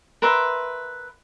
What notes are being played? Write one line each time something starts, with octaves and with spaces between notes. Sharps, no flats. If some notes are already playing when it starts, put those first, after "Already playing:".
A#4 B4 E5 C6